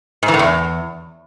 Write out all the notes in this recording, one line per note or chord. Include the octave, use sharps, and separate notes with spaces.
G#2
E3
A2
E2